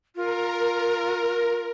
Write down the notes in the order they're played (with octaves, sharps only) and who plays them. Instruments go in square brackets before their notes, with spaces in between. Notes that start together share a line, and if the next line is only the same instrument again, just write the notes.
[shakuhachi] F4 [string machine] A#4